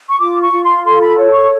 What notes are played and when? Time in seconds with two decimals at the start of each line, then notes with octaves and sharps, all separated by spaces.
0.09 C#6
0.19 F4 D6
0.42 C#6
0.52 F4
0.63 C6
0.84 A4 C6
1.01 B5
1.17 C#5
1.32 C#6